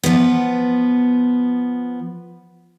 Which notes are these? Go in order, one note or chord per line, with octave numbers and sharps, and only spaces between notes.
F3 B3